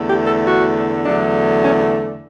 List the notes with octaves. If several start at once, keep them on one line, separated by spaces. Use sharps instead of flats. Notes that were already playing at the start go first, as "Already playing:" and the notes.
Already playing: E2 D3 A3
G4
A4
F#4
E2 D3 F#3 A3 D4
C#4